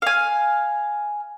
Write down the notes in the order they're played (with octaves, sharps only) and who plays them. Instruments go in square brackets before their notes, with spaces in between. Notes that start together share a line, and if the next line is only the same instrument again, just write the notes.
[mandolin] F5 G#5